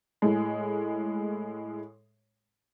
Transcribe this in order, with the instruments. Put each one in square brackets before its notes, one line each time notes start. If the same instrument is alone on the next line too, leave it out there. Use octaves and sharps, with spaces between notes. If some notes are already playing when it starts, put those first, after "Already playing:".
[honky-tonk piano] A2 G#3